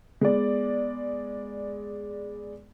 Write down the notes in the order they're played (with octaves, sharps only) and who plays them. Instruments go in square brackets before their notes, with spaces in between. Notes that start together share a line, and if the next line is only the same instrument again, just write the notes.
[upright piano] G#3 B3 D5